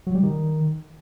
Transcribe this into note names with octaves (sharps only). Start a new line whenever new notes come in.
F#3
G3
D#3